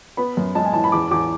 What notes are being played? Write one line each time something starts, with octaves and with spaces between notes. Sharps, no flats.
B3 B5
F#2
G#3 A5
G#5
E3 A5
B5
E2 D6
E2 D6